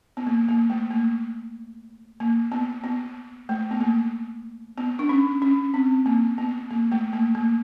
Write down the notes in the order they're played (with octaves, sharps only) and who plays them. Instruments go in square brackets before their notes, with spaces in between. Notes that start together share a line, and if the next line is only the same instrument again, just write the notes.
[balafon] B3
A#3
A#3
A3
A#3
A#3
B3
B3
A3
B3
A#3
B3
D4
C#4
C#4
C4
A#3
B3
A#3
A3
A#3
A#3